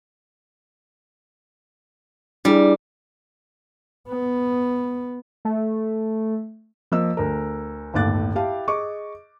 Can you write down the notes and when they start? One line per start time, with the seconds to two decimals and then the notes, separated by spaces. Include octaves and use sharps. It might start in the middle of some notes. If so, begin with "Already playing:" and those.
2.45 G3 D4 E4 G#4
4.09 B3
5.45 A3
6.92 F3 A#3 D#5 E6
7.17 D2 A#4
7.94 G1 D#2 A2 D6 F#6 A6
8.35 E4 G4 F5 A5
8.68 G#4 D#5 C#6 D6